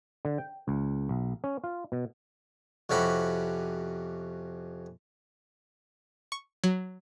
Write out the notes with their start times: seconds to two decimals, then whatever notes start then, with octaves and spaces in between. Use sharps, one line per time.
0.25 D3
0.38 G5
0.68 C#2
1.09 B1
1.44 C#4
1.64 F4
1.92 B2
2.90 F2 C3 C#4 F#4 G4 B5
6.32 C#6
6.64 F#3